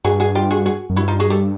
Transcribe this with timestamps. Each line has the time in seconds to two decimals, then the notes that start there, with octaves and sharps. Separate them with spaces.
0.05 G2 F#4 G#4
0.20 F#4 G#4
0.35 F4 G4
0.51 F#4 G#4
0.66 F#4 G#4
0.90 F#2
0.96 G2 E4 F#4
1.08 D#4 F4
1.20 F#4 G#4
1.30 G4 A4